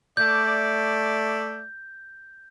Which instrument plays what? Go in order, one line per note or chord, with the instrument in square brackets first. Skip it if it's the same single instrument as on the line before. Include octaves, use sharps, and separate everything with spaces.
[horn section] A3 D5 [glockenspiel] G6